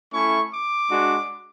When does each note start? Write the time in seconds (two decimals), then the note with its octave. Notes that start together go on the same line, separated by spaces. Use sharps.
0.12 A3 C#4 E4 C#6
0.51 D6
0.90 G#3 D4 F#4